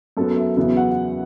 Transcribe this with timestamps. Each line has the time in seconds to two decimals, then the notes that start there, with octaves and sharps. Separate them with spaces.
0.17 F#2 F#3 B3 A4
0.36 E5
0.57 E2 C#3 F#3 B3 E5
0.77 F#5